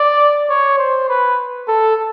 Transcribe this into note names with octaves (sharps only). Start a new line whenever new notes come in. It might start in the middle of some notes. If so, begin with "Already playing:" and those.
Already playing: D5
C#5
C5
B4
A4